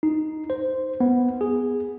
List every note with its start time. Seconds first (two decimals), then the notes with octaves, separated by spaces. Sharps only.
0.03 D#4
0.50 C5
1.00 B3
1.41 G#4